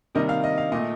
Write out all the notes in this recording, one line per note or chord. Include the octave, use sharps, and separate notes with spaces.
C3 D#3 G3 A#3 D#5
F5
D#5
F5
A#2 A3 D#5